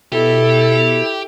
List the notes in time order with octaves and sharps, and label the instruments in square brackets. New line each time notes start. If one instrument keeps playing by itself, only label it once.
[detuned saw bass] B2 [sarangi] E4 [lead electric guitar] G4 [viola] A4